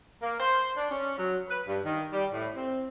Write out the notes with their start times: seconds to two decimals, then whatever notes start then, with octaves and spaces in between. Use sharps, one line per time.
0.22 A#3
0.40 C5
0.77 D4
0.91 C#4
1.18 F#3
1.49 B4
1.67 G2
1.85 D#3
2.12 G3
2.33 A2
2.55 C4